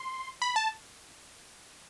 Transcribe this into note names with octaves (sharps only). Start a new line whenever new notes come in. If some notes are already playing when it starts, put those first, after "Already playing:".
Already playing: C6
B5
A5